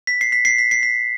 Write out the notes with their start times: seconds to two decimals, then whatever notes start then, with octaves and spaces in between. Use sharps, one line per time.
0.07 B6
0.21 C7
0.32 B6
0.45 C7
0.58 B6
0.71 C7
0.83 B6